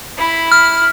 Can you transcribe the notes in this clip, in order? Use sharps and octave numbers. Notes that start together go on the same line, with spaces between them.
E4 B5
F6